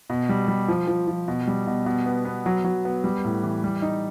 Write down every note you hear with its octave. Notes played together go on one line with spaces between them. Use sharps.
B2
G3
G3
F3
F3
F3
B2
G3
B2
B2
B3
B3
F#3
F#3
B3
G3
A2
E3
G3
D#4